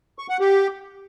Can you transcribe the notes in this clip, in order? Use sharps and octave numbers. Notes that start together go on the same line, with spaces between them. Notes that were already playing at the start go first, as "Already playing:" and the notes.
C#6
F#5
G4